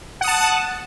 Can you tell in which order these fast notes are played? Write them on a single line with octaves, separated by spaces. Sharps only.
F#5 D#6 A5